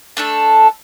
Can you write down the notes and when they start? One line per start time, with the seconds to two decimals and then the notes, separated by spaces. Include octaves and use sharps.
0.17 A3 D4 A4